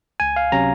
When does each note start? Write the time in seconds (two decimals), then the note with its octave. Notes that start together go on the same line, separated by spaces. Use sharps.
0.20 C#2 G#5
0.36 F5
0.52 C3 F#3 C#4 A#5